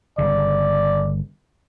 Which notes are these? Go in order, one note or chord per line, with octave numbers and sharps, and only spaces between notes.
G1 C#3 D5